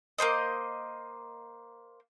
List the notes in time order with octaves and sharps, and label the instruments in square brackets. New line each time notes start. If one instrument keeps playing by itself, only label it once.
[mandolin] A#3 F#4 C5 D#5